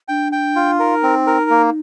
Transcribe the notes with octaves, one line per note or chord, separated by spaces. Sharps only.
D4 G5
G5
F4
D#4 A#4
C4
A#4
A#3